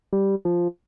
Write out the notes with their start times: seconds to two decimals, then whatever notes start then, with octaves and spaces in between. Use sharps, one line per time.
0.13 G3
0.45 F3